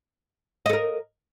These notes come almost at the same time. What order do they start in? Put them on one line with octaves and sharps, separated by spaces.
D#5 A4 A#4